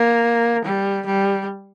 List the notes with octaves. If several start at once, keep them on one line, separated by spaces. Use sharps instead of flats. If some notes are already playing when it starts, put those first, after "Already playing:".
Already playing: A#3
G3
G3